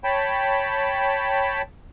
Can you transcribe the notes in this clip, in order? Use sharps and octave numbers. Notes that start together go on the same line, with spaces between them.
C#5 G5 A5 B5